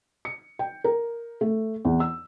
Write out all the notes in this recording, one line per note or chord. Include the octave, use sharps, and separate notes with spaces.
C#7
G5
A#4
A3
E2
E6